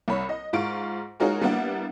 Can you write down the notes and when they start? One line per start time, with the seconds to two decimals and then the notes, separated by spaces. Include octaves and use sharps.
0.08 C2 C#5 B5
0.29 D#5
0.53 G#2 F4 C#6 D7
1.20 G#3 D#4 F4 F#4 A#4 C#5
1.42 G3 A#3 B3 D4 E4 F#5